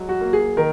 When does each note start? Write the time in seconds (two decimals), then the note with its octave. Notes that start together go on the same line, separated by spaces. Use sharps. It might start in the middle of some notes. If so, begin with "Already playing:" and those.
Already playing: F#3 G#3
0.09 F#4
0.21 A#3
0.33 G#4
0.57 D#3 A#4